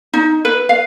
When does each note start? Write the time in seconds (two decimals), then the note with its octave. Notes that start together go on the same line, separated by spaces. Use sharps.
0.13 D#4
0.45 B4
0.69 F5